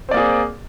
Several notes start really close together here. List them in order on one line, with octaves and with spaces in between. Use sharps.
C4 D5 A#3 G#4